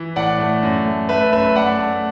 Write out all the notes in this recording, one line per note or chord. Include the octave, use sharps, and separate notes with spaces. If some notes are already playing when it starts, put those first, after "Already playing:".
Already playing: E3
A2 D5 F#5
A3
F#2
A3
A3 B4 E5
F#2 B4 E5
A3 D5 F#5
A3